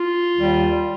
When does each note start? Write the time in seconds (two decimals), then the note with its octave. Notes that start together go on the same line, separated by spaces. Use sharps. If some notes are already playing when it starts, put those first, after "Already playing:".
Already playing: F4
0.36 D#2 D#3 G3